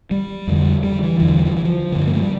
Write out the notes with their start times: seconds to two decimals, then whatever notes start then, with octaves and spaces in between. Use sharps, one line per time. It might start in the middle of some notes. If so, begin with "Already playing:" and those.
0.11 G3
0.47 F2 D3
0.84 G3
1.03 E3
1.20 E2 D3 E3
1.39 G3
1.47 F3
1.57 E3
1.65 F3
1.92 G2 D3
2.07 A#3
2.14 A3
2.22 G3